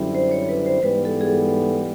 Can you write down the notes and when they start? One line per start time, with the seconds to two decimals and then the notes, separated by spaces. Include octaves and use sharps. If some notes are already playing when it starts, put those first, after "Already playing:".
Already playing: F#2 D3 G3 C4 E4
0.15 C5
0.31 C#5
0.49 B4
0.66 C5
0.82 G#2 E3 G3 B3 B4
1.05 A4
1.21 G#4
1.27 A4